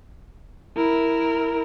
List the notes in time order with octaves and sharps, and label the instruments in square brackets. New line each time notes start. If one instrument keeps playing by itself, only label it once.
[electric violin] E4 A#4